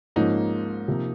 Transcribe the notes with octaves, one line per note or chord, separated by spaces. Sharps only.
G#2 F3 A#3 C#4 D#4
C3 F3 A#3